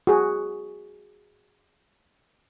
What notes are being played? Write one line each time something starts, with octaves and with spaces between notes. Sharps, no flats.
F#4 G#4